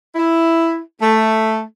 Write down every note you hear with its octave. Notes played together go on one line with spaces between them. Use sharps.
E4
A3